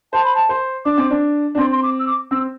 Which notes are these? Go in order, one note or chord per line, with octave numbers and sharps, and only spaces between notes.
C5 A5
B5
A5
C5
D4 D6
C4
D4
D4
C4 C6
C6
D6
E6
D6
C4 E6